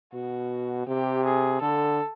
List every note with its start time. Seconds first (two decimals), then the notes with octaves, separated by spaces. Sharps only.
0.13 B2 F#4
0.87 C3 G4
1.25 G#4
1.61 D3 A4